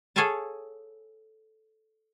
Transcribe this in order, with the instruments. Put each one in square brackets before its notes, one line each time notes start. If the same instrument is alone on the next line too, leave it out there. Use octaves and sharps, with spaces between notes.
[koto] G#4 A4 C#5 F5 G#5 A5